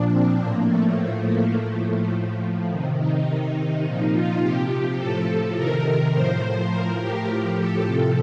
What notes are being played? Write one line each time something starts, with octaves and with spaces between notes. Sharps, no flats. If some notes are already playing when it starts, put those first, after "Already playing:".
Already playing: A#2 F3 D4
C4
A2 F3 A#3
A3
A2 F3
A#3
A2 F3 A3
A2 F3
C3 D#3
D#4
C3 D#3
A#2 F3
F4
C3 F3 G4
A2 F3 A4
C3 D#3 A#4
A2 F3 C5
A2 F3 A#4
G4
A2 F3
A4
C3 F3